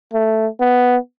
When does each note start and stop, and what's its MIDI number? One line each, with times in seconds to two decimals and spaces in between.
0.13 0.47 57
0.60 0.97 59